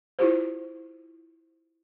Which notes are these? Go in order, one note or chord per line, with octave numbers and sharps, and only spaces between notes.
E4 F4 G4 C5